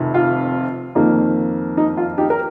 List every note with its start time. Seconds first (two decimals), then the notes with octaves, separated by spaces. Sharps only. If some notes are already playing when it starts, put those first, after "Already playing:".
Already playing: F1 F2 C3 D#3
0.14 F4
0.95 F2 D#3 A#3
1.77 D#4
1.97 F4
2.18 D#4 G4
2.30 A#4